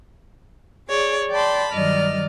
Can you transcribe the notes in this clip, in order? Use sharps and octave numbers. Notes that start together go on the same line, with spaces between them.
G#4 C#5 D5
D5 G5 A5 B5 C6
G2 D#3 F#3 D5 D#5 F6